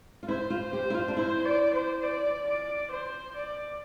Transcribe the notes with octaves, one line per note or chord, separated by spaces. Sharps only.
F4
E4 C5
F4
G4 C5
E4
F4
D4
E4 C5
D5
C5
D5
D5
C5
D5